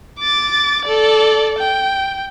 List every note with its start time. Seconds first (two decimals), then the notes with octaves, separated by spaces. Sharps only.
0.20 D6 A6
0.85 A4 D5
1.58 G5